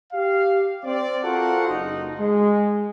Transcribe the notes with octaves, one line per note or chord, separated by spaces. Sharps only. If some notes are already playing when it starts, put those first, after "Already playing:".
G4 F5
C4 D5
F4 F#4 A4 A#4 C5 F#5
F#1 D#4
G#3